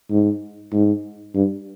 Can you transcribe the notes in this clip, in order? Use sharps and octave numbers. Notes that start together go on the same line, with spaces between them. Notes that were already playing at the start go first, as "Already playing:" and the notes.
G#2
G#2
G2